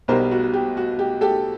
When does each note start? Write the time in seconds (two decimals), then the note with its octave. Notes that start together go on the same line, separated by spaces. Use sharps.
0.08 B1 B2 G3 A#4 C5
0.31 F#4
0.54 G4
0.77 F#4
0.99 G4
1.21 G4 A4